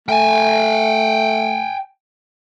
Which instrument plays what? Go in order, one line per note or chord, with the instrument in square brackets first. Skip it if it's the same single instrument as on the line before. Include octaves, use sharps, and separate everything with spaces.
[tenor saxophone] A3 [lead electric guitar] G5 G#5